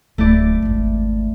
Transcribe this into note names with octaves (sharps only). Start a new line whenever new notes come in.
D1 A3 E4 D5
G#1 E2